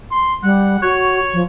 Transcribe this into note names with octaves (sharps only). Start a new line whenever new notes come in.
C6
G3 F#5
F#4 C#5
F3